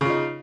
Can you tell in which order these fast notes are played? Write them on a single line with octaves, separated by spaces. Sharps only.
C#3 F4 D#4